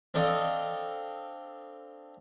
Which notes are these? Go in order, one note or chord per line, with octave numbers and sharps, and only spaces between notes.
C4 D4 A4 D#5 F5